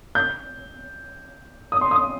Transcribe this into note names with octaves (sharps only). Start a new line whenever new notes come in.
G6
D#6
C6
D#6